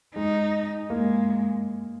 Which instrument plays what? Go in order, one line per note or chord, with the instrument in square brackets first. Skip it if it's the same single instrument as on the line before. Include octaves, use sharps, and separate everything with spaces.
[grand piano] G#3 [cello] D#4
[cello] G#3 [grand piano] A#3